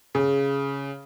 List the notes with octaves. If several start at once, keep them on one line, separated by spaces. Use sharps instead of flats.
C#3